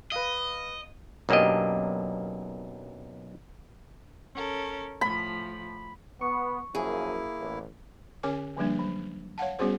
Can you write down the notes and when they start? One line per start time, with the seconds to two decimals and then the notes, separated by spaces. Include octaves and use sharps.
0.12 B4 D#5 F5
1.29 B1 F#2 A#3 D4 G4 D#5
4.34 C#4 A4 A#4
5.01 A2 F3 B5
6.21 B3 C#6
6.75 F#2 F3 A#3 E4 G#4
7.40 A1
8.23 D3 C#4 A#4 C#5 D6
8.57 D3 F3 G3 A#3 D4
8.79 F#3
9.38 C#5 F5 F#5 A5
9.59 G3 B3 C#4 F#4 G#4 C5